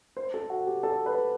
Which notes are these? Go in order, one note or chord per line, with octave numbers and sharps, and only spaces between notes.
C5
A4
F#4
G4
A4
B4